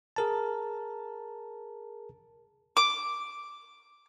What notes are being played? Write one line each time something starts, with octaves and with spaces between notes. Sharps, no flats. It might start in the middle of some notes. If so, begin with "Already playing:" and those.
G#4 A#4 A5
D6